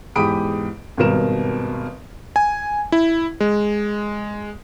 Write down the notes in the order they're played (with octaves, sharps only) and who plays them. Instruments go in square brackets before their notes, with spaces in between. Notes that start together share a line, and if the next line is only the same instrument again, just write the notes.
[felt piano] E2 G#2 G4 B5 D#6 D7
G#1 G2 B2 A#4 E7
[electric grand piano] G#5
E4
G#3